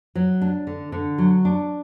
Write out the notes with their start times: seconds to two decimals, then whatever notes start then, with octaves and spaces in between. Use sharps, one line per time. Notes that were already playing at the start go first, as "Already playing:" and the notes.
0.15 F#3
0.41 D4
0.67 D3
0.92 D3
1.18 F#3
1.45 D4